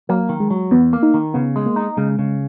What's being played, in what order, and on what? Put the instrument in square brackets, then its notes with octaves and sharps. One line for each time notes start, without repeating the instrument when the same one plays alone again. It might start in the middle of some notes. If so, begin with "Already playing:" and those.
[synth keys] F#3 [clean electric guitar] A#3
[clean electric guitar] D#3
[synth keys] G#3
[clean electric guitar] F#3
[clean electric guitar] E2 [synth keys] B3
[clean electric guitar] A#3
[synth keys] D#4
[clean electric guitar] D#3
[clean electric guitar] C#3 [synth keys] B3
[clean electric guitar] G#3
[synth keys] A#3
[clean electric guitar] D#4
[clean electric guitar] C#3 [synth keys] G#3
[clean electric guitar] C#3